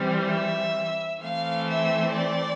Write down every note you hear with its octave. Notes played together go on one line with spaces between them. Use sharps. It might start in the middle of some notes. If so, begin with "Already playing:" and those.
Already playing: E3 G3 C4
E5
E3 A3 C4 F5
E5
D5